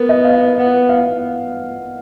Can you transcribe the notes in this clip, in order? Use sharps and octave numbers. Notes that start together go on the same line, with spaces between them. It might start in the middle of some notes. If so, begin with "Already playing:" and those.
Already playing: B3 A#4
D#5
F5
B3 F#5
F5